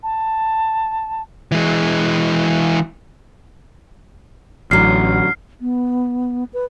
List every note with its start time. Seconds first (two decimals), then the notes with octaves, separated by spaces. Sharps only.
0.03 A5
1.52 E3 G#3
4.71 A1 D3 F#3 F6 C7
5.61 B3
6.53 B4